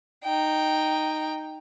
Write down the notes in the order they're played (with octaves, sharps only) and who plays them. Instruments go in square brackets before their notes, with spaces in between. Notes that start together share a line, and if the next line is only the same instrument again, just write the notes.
[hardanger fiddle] D#4 G5